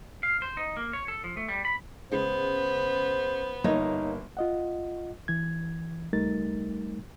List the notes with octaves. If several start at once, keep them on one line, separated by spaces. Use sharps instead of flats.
F5
C5
D#4
A#3
C#5
A4
F3
A3
G3
B5
C#3 G#3 B3 C5
G1 A#3 D#4 C#5 D#5
F4 D#5 F#5
E3 G#6
C#2 G3 A3 D#4 A#4 A6